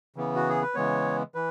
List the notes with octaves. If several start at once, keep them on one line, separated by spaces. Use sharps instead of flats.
C#3 E3 B3
F#4
G#4
B4
C#3 E3 G#3 B3 C#5
E3 B4